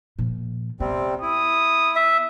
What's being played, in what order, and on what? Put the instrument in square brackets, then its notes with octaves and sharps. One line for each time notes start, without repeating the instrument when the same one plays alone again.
[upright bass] A#2 F3
[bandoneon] C3 G3 C4 [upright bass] B3
[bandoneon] E4 [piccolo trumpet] D#6
[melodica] E5